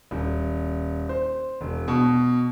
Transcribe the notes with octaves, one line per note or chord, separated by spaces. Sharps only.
D#1
C5
E1
B2